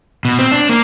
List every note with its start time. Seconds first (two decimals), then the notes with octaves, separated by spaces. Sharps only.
0.25 B2
0.39 C4
0.52 D4
0.69 A#3